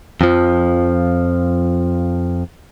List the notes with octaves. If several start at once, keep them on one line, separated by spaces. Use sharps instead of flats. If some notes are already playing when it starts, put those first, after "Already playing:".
F2 F3